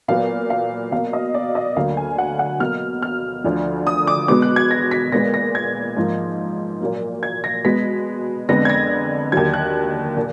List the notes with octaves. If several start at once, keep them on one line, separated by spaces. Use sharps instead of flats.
A#2 F#3 B3 F5
F5
B2 A#3 F5
D#5
D5
D#5
D2 D3 F#3 A#3 F5
G#5
F#5
F#5
B2 F#3 A#3 F6
F6
D2 D3 F3
D#6
D6
B2 G#3 B3 D6
F#6
G#6
A#6
B6
A#2 G#3 B3 A#6
A#6
G#6
G#2 F3 A#3
A#2 F#3 A#3
G#6
A#6
B2 G#3 B3 B6
F2 D3 G#3 B3 A#6
G#6
A#6
D#2 D3 F#3 G#6
F#6
A#2